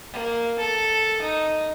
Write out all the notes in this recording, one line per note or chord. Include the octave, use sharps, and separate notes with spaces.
A#3
A4
D#4